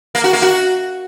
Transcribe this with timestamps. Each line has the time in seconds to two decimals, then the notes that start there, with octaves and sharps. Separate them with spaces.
0.15 A#3
0.24 F#4
0.33 A#3
0.42 F#4